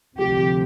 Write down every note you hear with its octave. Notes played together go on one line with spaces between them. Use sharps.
D2 C3 F3 G4